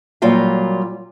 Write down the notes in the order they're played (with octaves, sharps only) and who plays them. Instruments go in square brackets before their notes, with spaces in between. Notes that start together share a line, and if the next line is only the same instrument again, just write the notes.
[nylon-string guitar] A#2 F#3 G3 F4 F#4 F5